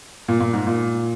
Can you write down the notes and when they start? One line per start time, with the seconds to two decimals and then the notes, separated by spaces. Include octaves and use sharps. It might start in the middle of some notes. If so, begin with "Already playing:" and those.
0.28 A#2
0.40 A#2
0.53 G#2
0.67 A#2